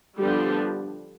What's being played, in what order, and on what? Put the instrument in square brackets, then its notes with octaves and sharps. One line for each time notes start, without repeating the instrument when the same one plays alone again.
[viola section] D3 F3 G3 B3 D4 G4